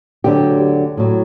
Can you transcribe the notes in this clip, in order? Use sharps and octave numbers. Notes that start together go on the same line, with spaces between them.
D2 D3 F#3 G4
A2 F#3